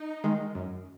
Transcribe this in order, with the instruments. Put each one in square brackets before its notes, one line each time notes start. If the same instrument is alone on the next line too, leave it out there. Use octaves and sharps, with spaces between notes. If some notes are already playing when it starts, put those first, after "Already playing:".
Already playing: [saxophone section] D#4
[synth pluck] D#3 G#3
F#2